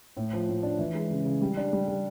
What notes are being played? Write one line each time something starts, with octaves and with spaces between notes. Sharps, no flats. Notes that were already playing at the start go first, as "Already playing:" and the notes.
A2
F3
A2
D4
E3
G#3
C#3
C#3
G3
D4
G3
G3